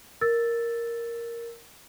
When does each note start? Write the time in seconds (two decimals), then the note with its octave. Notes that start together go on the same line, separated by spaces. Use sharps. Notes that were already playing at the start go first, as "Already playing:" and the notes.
0.21 A#4 E6 A6